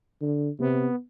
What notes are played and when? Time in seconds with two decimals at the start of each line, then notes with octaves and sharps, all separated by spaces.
0.21 D3
0.60 C3 B3